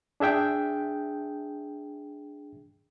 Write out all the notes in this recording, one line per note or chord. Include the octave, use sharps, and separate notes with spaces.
D4 G#4 E5 G5 G6